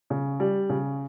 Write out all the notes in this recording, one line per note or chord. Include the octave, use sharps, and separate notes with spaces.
C#3
G3
C#3